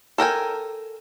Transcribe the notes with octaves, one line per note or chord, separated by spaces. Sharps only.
A4 A#4 G5 G#5